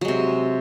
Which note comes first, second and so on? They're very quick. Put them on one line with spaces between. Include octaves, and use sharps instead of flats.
F#3 G#3 C3